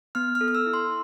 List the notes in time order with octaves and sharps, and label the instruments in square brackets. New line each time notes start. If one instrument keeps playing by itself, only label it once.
[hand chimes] B3 F6
F6
A4
F6
E6
E4
C6